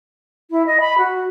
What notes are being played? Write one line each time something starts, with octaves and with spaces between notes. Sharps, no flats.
E4
D#5
B5
F#4